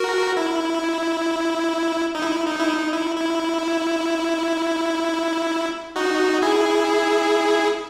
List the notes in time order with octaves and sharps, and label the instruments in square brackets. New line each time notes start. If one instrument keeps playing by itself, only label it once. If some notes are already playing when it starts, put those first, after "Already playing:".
Already playing: [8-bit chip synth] F#4 A#4
E4
D#4
E4
D#4
E4
D#4
E4
E4
D#4 F#4
E4 G#4